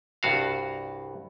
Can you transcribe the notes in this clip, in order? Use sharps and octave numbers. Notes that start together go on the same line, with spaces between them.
C2 G2 F#4 F5